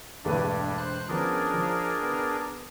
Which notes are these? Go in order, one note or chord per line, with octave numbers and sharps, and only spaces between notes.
E1 G2 A3 D4 B4
C5 F#6
F3 B3 C#4 D4 G#4 A#4
F3
B3